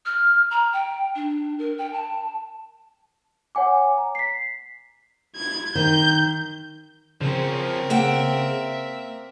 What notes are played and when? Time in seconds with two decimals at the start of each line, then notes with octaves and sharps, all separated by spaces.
0.05 F6
0.50 A#5
0.73 G5
1.15 D4
1.58 A#4
1.78 G5
1.93 A5
3.55 C#5 F#5 G#5 D6
3.98 A#5
4.15 B6 C7
5.36 G#6
5.75 D#3 G6
7.21 C#3 F3 C4 C#4 A#4
7.90 A#3 E5 F#5 G5